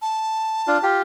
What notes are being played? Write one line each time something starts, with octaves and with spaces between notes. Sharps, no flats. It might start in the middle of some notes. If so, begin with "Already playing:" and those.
A5
D4 F4
F4 G4